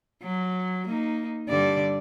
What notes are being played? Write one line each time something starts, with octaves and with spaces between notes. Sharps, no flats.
F#3
A#3 D#4
G2 D3 D5